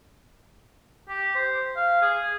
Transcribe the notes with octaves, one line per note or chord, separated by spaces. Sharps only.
G4
C5
F5
G#4